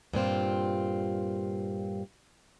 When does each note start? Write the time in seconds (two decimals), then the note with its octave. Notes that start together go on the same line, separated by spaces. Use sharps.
0.14 G2 A#2 C4 F4